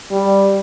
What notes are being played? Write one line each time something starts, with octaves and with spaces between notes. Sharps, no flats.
G3